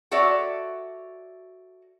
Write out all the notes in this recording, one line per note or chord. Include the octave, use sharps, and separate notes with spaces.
F#4 A4 C#5 D5 E5